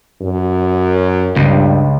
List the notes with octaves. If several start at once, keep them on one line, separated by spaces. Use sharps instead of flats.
F#2
C#2 G2